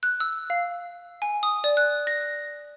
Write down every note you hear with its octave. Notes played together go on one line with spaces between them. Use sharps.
F#6
E6
F5
G#5
D#6
D5
F#6
A#6